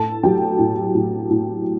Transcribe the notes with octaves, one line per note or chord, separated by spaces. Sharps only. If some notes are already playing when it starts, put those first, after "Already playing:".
Already playing: A2 A4 A5
F#3 G4 G5
A2
A2
A2